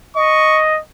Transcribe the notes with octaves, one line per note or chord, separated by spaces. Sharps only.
D#5 C#6